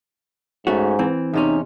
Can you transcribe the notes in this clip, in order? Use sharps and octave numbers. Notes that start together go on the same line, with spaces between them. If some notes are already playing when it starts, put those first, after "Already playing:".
G#2 A3 C#4 F#4
E3 C4
E2 C3 C#4 D#4